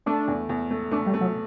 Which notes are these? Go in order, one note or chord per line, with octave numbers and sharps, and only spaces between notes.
A3 D4
E2
E2
A3
A3 D4
G3
A3
F#3